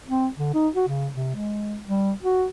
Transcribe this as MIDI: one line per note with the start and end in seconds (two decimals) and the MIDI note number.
0.08 0.27 60
0.39 0.52 50
0.54 0.69 63
0.75 0.88 66
0.89 1.09 49
1.14 1.31 48
1.36 1.79 56
1.87 2.12 55
2.23 2.46 66